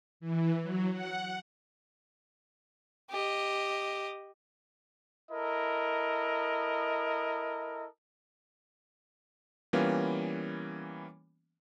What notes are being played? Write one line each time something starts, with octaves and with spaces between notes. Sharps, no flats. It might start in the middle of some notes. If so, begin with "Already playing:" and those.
E3
F#3
F#5
G4 D#5
E4 A4 A#4 D#5
E3 G3 A#3 B3 C#4 F4